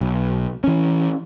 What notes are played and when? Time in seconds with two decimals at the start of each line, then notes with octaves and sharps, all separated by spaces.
0.01 B1
0.64 E3 C#4